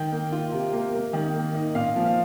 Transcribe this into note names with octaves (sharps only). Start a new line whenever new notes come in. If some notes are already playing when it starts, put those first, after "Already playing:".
Already playing: D#3 G5
A#3
F4
C3
A#3
A#3
D#3
A#3
D#4
A#2 F5
F3
F5